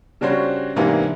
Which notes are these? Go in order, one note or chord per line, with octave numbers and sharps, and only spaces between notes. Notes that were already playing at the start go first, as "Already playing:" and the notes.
C#3 G3 D4 F#4 C5 C#5
G#2 C3 E3 A#3 B3 D4